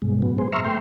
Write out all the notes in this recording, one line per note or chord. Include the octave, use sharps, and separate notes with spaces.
G2 B2 G#3
A2 F#3 B3
B3 G#4 C5
E5 A#5 C6 C#6 E6 F6
A3 G5 C6